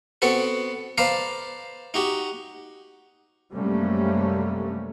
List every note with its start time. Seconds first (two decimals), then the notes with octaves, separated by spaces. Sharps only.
0.22 B3 C4 F#4 A4 B4
0.98 B4 C5 D5 F5 A5 A#5
1.94 D#4 F#4 G4
3.51 F#2 C3 G3 A3 A#3 C#4